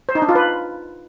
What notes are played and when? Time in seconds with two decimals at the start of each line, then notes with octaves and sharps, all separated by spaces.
0.09 C5
0.15 D#4
0.22 D4
0.29 F4
0.35 B4